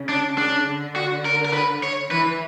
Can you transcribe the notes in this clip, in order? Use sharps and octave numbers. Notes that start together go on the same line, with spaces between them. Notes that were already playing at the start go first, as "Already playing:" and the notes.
Already playing: C#3
D4
C#3 D4
D3
F#4
A#4
A#4
B4
C#5
E3 B4